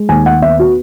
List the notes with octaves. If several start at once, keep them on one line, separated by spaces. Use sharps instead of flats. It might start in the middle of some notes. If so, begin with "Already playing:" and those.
Already playing: G#3
D#2 G#5
F#5
B3 E5
F#4